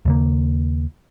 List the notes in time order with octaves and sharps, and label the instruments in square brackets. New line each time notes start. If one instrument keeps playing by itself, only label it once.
[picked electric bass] D#2 C#3 A#3